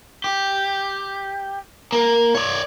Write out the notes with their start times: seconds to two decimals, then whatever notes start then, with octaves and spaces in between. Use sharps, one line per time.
0.24 G4
1.92 A#3
2.35 C#5 D5